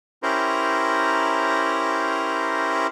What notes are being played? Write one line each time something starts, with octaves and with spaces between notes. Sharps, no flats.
C#4 E4 G4 A#4 C5 A#5